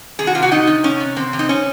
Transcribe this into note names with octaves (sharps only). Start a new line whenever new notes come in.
C3 G#4
F#4
C3 F4
F#4
C3 D#4
C3
C3 C#4
C3
C3 C4
C3
D#4
C#4